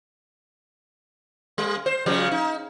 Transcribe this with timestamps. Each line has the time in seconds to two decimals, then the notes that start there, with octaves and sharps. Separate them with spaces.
1.58 G3
1.86 C5
2.06 C#3 F3 G#3
2.32 D#4